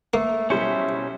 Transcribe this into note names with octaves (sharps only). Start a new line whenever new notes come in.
A3 A#3
B1 G3 C#4 E4 C5 C#7